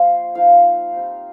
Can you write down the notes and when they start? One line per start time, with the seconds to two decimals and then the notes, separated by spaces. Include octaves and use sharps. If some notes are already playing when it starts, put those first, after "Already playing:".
Already playing: F3 A#3 F4 C5
0.35 F3 D#4 F5
0.93 G3 C4 D#4